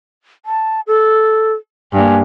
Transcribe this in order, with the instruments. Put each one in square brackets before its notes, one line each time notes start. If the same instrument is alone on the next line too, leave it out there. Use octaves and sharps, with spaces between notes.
[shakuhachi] A5
A4
[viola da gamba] G2 A#3 [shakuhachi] G#5